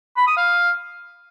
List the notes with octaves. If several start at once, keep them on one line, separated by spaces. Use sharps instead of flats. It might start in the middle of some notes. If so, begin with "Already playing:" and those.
B5
D#6
F5